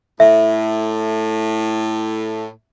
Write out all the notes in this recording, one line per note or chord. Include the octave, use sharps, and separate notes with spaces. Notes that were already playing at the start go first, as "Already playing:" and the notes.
A2 E5